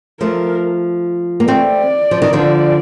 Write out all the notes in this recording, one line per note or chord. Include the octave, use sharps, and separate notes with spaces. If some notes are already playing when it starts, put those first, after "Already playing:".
F3 A3 A#4
A#3
A3 C4 D5
F3
D#3
D3 F3